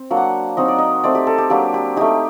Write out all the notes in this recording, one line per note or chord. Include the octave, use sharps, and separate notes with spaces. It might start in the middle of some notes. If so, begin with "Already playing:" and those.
Already playing: C4
F#3 A#3 D4
F#5
F#3 C4 D#4 D#5
D5
D#5
A3 C4 D#4 D5
G4
A4
G4
F#3 A#3 D4 G4
G4
A3 D#4 G4